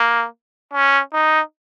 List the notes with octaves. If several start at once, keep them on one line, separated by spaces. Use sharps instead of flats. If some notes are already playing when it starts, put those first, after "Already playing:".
Already playing: A#3
C#4
D#4